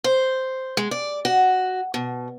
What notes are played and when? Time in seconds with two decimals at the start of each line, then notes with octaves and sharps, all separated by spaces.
0.04 C5
0.77 G#3
0.91 D5
1.25 F#4
1.94 B2